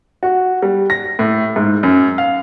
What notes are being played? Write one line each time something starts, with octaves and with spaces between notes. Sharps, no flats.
F#4
G3
A#6
A2
G#2
F#2
F5